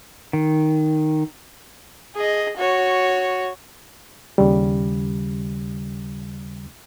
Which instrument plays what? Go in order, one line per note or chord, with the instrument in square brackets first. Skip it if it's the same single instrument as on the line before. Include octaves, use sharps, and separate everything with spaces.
[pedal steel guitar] D#3
[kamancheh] G#4 D#5
F#4 C#5
[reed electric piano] D#2 C#3 G3